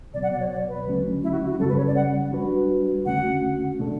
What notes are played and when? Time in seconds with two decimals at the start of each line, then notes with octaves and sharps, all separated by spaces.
0.14 C#2 B2 F#3 B3 D5
0.23 F#5
0.32 D5
0.40 C#5
0.50 D5
0.68 B4
0.86 D2 D3 F#3 A3 C#4
1.23 E4
1.32 F#4
1.41 E4
1.50 F#4
1.59 F#2 C#3 G3 C#4 A4
1.69 B4
1.78 C#5
1.87 D5
1.96 F#5
2.31 G3 D4 F#4 B4
3.05 E2 D3 A3 C#4 F#4 F#5
3.79 B2 A3 D4 A4